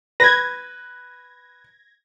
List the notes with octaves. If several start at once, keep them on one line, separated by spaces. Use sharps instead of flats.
B4 G#6 A#6